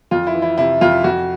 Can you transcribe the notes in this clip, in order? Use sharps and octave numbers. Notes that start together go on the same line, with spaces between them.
F2 F4
E4
E3
E4
C3 E4
F2 F4
F2 F#4